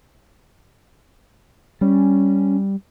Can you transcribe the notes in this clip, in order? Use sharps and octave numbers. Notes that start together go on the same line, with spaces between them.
G3 C#4